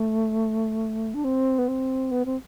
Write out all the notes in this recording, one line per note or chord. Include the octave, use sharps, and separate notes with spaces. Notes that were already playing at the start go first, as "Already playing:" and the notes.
Already playing: A3
D4
C4
B3
C4
B3
C4